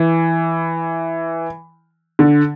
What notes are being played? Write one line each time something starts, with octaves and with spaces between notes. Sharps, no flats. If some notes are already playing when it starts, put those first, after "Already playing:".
Already playing: E3
D3